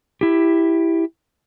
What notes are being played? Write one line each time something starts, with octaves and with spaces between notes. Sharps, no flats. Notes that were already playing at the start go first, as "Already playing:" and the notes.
E4 G4